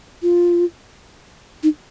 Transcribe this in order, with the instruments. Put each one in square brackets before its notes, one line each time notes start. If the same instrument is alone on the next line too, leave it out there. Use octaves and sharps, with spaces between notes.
[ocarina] F4
D#4